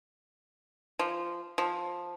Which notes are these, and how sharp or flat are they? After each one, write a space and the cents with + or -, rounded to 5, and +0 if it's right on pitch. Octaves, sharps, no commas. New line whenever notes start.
F3 -15
F3 +10